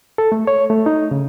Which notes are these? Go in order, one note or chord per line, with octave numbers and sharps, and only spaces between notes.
A4
A3
C#5
A3
D#4
C#3